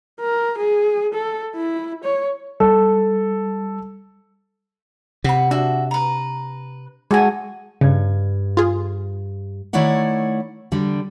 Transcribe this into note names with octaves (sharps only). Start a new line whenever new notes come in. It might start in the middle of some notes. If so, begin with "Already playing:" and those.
A#4
G#4
A4
E4
C#5
G3 A4
C3 F#5 B5
D4 F#4 E5
B4 A#5
G#3 F#4 A4 F#5 G#5
G2 C#3 F6 G#6
F4 G#4
D#3 A3 E4 C#5 D5 F#5
D3 G3